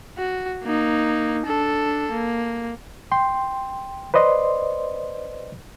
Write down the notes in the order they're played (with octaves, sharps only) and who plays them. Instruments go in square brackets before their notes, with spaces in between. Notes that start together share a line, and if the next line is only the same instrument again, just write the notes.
[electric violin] F#4
A#3 D#4
D4 A4
A#3
[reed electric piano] G5 C6
B4 C5 D5 D#5 C6